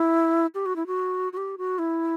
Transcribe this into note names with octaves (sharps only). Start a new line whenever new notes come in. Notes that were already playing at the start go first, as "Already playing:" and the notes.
Already playing: E4
G4
F#4
E4
F#4
F#4
G4
F#4
E4